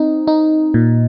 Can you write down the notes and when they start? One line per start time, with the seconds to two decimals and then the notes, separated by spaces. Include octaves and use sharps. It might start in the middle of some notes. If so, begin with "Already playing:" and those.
Already playing: C4 D#4
0.27 D#4
0.74 A#2